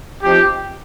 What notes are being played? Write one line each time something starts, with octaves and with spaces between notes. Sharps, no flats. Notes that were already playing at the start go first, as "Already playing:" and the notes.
F3 C4 D#4 G4